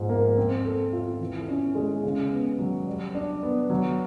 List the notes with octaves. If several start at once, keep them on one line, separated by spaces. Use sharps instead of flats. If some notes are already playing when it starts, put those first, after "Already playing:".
Already playing: G#2 F3
A#3
C4
A4
F4
E3
C#4
G#3
C#3
B3
F#3
G3
D4
B3
F#3